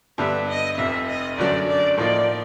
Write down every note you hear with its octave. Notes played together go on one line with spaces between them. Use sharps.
G2 D3 G3 B3 E5
D#5
F1 F2 C3 E5
D#5
G1 F#2 D3 F#3 A3 D5
D5
A2 F3 A#3 D#4 D5